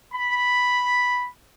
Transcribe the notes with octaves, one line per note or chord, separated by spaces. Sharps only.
B5